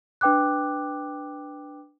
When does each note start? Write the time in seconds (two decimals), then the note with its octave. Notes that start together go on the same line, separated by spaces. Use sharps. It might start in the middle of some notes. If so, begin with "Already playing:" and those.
0.21 D4 B4 G5 D6 F#6